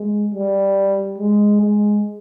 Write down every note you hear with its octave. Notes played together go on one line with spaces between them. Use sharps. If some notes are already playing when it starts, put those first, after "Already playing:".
Already playing: G#3
G3
G#3
G#3